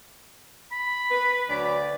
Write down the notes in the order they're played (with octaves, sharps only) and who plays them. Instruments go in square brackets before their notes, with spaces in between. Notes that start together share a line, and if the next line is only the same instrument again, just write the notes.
[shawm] B5
[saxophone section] B4
D2 F#3 D5